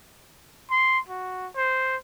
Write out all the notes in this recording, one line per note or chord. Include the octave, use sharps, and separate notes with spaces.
C6
F#4
C5